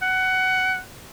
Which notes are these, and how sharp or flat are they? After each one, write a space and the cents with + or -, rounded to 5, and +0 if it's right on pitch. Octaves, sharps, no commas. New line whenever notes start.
F#5 +15